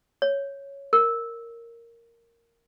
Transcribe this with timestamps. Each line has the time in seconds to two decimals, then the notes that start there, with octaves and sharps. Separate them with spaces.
0.22 C#5
0.93 A#4